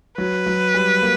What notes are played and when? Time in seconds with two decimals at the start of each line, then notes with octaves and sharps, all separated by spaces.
0.18 F#3 B4
0.46 F#3
0.74 G3
1.02 A#3